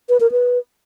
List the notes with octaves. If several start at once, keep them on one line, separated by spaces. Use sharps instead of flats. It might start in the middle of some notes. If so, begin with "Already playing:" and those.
B4
A#4
B4